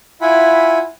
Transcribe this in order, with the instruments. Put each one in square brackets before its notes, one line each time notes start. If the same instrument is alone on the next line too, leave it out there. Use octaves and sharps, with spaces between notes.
[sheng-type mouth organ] E4 F4 E5 F#5 G#5 B5